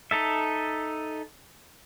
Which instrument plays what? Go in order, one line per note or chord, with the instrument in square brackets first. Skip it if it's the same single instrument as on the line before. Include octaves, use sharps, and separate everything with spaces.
[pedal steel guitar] D#4 A4 E5